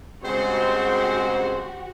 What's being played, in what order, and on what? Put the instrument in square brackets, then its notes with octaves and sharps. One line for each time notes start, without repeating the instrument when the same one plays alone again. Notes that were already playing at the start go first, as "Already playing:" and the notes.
[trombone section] G2 G#3 C4 [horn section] C#3 C5 [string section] F#4 G4